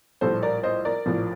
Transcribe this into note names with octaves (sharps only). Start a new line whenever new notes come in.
A#1 A2 G3 A4 C5
A#4 D5
C5 D#5
A#4 D5
A#1 A2 F3